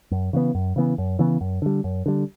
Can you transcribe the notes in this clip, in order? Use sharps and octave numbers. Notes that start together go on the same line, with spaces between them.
F#2
C#3 E3 B3
F#2
C#3 E3 B3
F#2
C#3 E3 B3
F#2
D3 G3
F#2
D3 G3